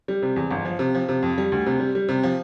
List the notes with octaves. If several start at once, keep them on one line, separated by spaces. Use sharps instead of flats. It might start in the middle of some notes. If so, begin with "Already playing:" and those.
G3
C3
E2
G1
F3
C3
F3
C3
F2
G3
D2
C3
G3
G3
C3
F3